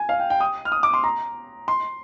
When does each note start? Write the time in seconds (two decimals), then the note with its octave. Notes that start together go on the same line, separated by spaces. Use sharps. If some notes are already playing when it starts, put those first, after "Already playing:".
Already playing: G#5
0.09 F5
0.20 G5
0.30 G5
0.40 D#6
0.65 F6
0.72 D#6
0.83 D6
0.94 C6
1.04 A#5
1.68 C6